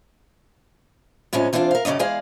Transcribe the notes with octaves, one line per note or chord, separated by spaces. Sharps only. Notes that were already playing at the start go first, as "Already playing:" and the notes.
A2 C3 F3 G#3 C#4
E3 C4 D4 F4 C5
A#4 F5
F#2 C#3 C#4 D5 D#5
E2 G#3 G#4 D5 F5